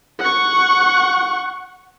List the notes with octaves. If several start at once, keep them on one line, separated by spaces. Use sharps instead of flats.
F#5 C#6